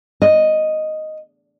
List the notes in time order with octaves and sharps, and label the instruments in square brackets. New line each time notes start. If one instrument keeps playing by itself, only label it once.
[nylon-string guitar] D#5